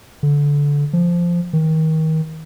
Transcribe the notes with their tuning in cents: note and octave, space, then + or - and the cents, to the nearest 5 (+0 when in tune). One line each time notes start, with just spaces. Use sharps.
D3 -20
F3 -10
D#3 +30